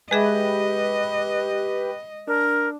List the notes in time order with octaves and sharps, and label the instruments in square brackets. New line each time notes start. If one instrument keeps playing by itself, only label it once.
[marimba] G#3 G#4 E5 [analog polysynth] G4 B4 [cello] D#5
[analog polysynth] D4 [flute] A#4